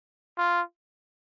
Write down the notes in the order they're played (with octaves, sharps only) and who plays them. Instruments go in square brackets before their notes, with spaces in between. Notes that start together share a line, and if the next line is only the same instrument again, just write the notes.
[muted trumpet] F4